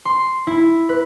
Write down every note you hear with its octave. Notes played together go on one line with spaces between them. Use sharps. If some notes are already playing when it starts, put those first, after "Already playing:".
C6
E4
B4